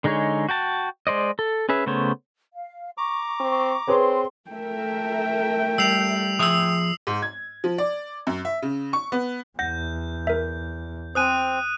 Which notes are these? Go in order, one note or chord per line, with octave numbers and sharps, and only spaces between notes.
D3 G#3 D#4 G#4 C#5
F#4 G5 A5
G#3 C5 D5 D#5
A4
C#4 G#4 B4 E5
C#3 A3 B3 C5 C#5
F5
A#5 C#6 D6
C4
C4 G#4 B4 C#5 C6
A3 A4 A#4 E5 G5
G3 E6 C7 F7
F3 G#4 E5 D#6 E6
G#2
G#6
F3
D5
F#2
E5
C#3
C#6
B3
E2 F#5 G6 A#6
A#4 E5
C4 C5 G#5 D#6 F#6 D#7